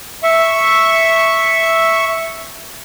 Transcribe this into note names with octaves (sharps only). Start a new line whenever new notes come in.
E5 C#6